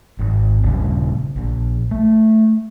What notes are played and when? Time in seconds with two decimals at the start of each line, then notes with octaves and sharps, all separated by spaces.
0.19 G#1
0.63 D#1 C#3
1.36 A#1
1.91 A3